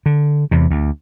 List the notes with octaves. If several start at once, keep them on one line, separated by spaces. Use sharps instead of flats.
D3
E2 C3
D2